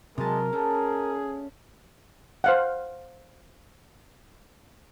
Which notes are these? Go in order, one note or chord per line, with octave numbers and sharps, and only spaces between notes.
C3 F#3 G#3 A#4 D#5 A5
A3 A#3 C#4 D4 G#4
C5 F5 F#5